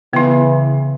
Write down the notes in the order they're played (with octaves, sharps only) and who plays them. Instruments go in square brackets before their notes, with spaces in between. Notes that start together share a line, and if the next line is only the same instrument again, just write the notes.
[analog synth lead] C#3 [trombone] E3 [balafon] B3 E4